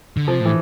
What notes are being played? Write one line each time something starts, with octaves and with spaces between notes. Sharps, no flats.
D3
C3 F3
A2
E3